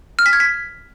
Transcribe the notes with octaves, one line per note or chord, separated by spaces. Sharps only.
F6
B6
G#6
B6